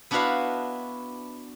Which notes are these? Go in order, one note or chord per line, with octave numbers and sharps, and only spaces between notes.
B3 D4 E4 F#4 B4 F5